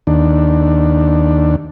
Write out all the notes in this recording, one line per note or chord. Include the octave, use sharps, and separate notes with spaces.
D#2 D4